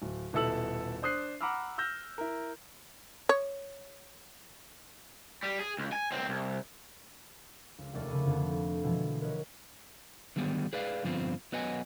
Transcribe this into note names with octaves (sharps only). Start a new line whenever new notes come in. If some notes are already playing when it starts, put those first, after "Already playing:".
D1
D#1 B2 E4 A4 E6 F#7
D4 C5 D#6 F#6 C7
F#5 A#5 B5 D6 E6 F6
E6 F6 G6 A#6
E4 A#4
C#5
G3
G#4
C#2
G#5
C#2 C4
C2
C#2
F1 D#2 A3 C#4 D5 F6
C#3 B5 D#7
F2 D3
B2 E3 F3 G#3
A#4 B4 C#5 D#5
D3 D#3 F#3 G3 B3
G#4 B4 D5 F5
G2 D3 F3 B3 C4 F4
F#3 B3 B4 D#5 F#5 G#5